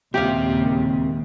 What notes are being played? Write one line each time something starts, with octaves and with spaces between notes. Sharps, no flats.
D#2 A#2 C#3 G#3 C4 G4 E5 F5